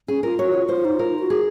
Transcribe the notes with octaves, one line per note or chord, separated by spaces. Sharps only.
C#4 G#4
F4 A#4
F#4 C#5
F4
F4 C5
D#4
F4 A#4
F#4
G#4